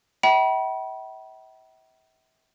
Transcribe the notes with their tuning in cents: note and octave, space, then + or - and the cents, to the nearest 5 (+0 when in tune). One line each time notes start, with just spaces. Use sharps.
E5 -35 G5 -45 B5 -35